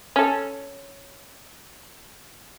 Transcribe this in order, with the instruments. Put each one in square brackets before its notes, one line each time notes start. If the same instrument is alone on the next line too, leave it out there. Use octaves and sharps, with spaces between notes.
[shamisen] C#4 A4